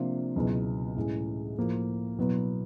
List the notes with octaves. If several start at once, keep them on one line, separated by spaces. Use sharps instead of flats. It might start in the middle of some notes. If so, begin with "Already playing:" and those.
Already playing: C3 F3 A#3 D4 F4
C#2 B2 F#3 B3 E4
A2 E3 G#3 C#4
A2 F3 A#3
B2 F#3 B3 E4